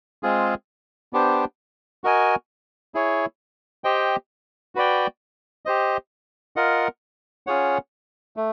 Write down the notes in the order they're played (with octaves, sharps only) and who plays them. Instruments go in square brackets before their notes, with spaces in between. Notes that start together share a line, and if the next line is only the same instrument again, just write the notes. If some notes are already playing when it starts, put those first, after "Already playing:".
[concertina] G#3 C4 F4 G#4
B3 D4 G4 C5
F#4 A#4 D#5 G#5
E4 G#4 C#5
G4 C5 D#5 G5
F#4 B4 D5 G5
G4 C5 D#5
F4 A#4 D#5 F#5
C#4 F4 G#4 C#5 F#5
A3